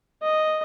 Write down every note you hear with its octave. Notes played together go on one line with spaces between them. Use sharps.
D#5